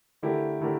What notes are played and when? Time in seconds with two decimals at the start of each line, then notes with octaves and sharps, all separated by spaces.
0.23 D3 A3 E4 G4 A#4
0.60 D3 A3 E4 G4 A#4